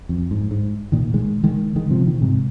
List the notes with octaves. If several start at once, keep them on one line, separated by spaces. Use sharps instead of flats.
F2
G#2
G#2
A#2 D#3
D#3 G#3
D#3 G#3
D#3 G#3
C3 F3
A#2 D#3
G#2 C3